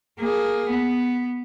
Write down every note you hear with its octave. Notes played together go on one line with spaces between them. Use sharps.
A#3 G#4
B3